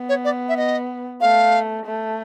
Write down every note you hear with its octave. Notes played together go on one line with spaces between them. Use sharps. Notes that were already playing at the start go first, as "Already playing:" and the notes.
Already playing: B3
C#5
D5
E5
D#5
A3 F5
A3